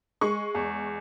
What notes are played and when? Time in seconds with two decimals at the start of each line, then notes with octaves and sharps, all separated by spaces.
0.21 G#3 C#6
0.55 E2